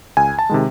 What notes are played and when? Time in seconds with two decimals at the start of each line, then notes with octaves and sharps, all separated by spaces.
0.17 C#2 G#5
0.39 A5
0.50 C3 D#3 G#3